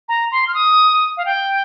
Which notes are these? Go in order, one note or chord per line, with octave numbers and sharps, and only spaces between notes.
A#5
C6
F6
D#6
F5
G5